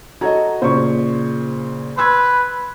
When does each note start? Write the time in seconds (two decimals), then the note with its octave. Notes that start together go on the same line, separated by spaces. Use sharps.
0.21 F#4 A4 C#5 D#5 A#5 G#6
0.62 A#2 C#3 C5 C#6
1.98 B4 C6 E6 G#6